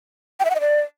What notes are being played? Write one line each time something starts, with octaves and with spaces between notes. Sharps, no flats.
G5
E5
F#5
D#5
D5